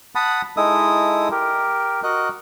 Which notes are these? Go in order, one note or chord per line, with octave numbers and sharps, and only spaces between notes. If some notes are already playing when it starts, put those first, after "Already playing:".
F#5 A5 B5 D#6
G#3 D#4 E4 A4 E5 D#6
G4 A#4
F#4 A#4 D#5 F#6